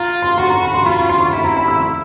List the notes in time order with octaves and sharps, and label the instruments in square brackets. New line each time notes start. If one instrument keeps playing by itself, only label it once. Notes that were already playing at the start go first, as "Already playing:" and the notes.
Already playing: [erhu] F4 [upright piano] A#5
[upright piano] C6
[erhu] F#4 [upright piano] C6
[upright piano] A#5
B5
C6
[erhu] F4 [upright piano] B5
[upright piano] B5
C6
C#6
[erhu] E4 [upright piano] B5
[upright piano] A#5
B5
E6